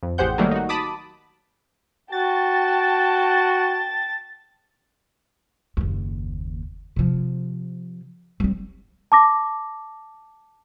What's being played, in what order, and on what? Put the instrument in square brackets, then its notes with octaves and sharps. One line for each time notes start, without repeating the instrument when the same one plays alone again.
[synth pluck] F2
A1 G4 G#4 C5 F#5 G6
D#3 F#3 G3 A3 A#3
D#4 F#4
A5 B5 D6 D#6
[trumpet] F#4 [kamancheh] G5 A5 [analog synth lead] A6
[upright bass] F#1 D#2
C3 F3
G3 C4
[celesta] A5 D6 A#6